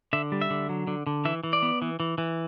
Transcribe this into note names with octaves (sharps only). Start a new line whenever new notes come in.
D3 E5
G3
E5
D3
F#3
D3
D3
E3 E5
E3
D5
B3
E3
E3
E3